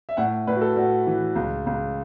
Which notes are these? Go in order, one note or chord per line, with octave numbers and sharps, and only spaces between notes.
E5
A2 F#5
A2 B4
F#4
A4
A2 F#4
E3
C#2
C#2